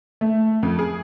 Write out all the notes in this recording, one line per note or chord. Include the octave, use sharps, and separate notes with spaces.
A3
F2
G#4